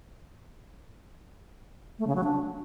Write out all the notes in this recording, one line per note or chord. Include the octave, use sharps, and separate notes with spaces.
A3
C#3
F#3
D4